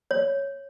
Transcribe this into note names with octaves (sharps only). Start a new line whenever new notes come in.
C#5